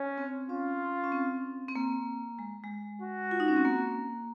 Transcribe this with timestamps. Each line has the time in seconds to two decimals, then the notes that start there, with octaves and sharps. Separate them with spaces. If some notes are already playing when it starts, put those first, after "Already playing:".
Already playing: C#4
0.18 C4
0.49 C#4 F4
1.04 C#4
1.12 C4
1.69 C4
1.76 A#3
2.39 G#3
2.64 G#3
3.02 F#4
3.31 F4
3.40 D#4
3.48 C#4
3.57 C4
3.65 A#3